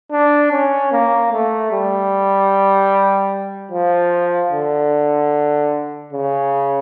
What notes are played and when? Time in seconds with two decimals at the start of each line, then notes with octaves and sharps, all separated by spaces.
0.12 D4
0.52 C#4
0.92 A#3
1.32 A3
1.72 G3
3.72 F3
4.52 D3
6.13 C#3